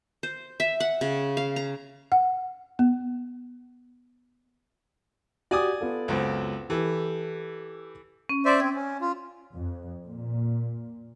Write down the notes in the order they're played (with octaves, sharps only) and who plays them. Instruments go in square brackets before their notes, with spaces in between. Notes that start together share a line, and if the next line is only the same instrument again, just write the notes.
[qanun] C5
E5
F#5
C#3
F5
A#5
[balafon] F#5
B3
[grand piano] F#4 G4 [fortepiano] D5 G#5 D#6
[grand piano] B3 F4 A4
[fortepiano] C#2 F#2 C4
[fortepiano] E3 [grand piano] G4 A4 B4
[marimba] C#4
[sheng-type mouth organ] C5 D5 E5
[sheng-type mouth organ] C4 [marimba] G#6
[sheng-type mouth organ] C#4
F4
[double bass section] F2
A#2